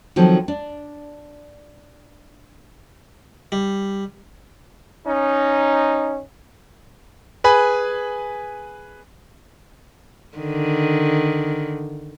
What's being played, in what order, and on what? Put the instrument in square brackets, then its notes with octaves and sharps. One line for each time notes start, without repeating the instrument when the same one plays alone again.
[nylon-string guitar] D#3 F3 F#3 C4 A4
D4
[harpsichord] G3
[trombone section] C#4 D#4
[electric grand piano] G#4 B4 G#5 B5
[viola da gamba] D3 D#3